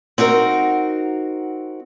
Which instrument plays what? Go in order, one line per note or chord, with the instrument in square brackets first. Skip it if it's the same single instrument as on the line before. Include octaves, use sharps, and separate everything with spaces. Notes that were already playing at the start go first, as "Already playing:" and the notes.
[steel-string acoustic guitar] C4 D#4 F#4 A#4